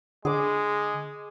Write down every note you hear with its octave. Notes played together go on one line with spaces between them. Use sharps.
D3 G#3 G#4 D6